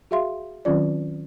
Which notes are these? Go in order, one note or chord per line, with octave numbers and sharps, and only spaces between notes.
F#4 G#4 E5 F5 C6
D#3 F#3 C4 C#4 F4 D5